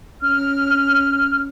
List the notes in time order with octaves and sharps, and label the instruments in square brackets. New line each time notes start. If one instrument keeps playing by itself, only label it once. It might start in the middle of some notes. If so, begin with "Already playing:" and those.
[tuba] C#4 [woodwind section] F6